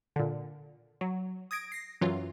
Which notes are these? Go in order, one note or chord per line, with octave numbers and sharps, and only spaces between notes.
A#2 D3
F#3
D#6 G#6 A#6 D7
A#6 C7
F#2 E3 F#3 F4